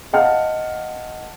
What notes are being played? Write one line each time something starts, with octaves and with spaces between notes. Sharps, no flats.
D#5 F5 F#5 A5 F6